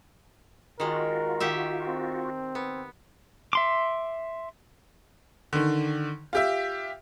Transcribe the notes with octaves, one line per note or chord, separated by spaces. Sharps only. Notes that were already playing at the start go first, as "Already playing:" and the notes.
D#3 G#3 F4 F#4 A#4
D#3 G4 E5
C4
B3
E5 C6 D6
D3 D#3
F4 G4 E5